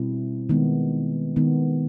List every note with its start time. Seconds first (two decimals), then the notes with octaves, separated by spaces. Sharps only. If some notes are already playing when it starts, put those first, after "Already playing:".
Already playing: B2 G3 C4 E4
0.49 D#3 G#3 B3
1.36 D#3 G#3 B3